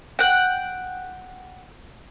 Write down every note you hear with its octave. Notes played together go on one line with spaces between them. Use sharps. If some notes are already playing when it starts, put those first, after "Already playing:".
F#5 G5